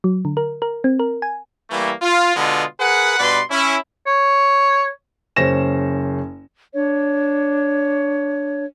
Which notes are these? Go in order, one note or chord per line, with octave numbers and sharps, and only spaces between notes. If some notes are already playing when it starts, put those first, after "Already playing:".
F#3
D3
A#4
A#4
C4
A#4
G#5
E3 G3 A3 A#3
F4
B2 D3 G#3 B3 F4
G#4 A#4 B4 F#5
G2 B2 B4 D5 C6
C#4 E4
C#5
F#1 C#4 C5 A#6 E7
D4 C#5